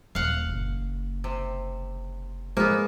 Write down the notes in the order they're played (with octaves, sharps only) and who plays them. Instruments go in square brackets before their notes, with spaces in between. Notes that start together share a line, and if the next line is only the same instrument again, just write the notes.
[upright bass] D#1 [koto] F5 F#5
[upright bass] F#1
[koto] C3
[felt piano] G#3 [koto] A#3 B3 [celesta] C5